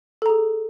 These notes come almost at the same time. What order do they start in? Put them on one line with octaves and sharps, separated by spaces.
A4 A#5 G#4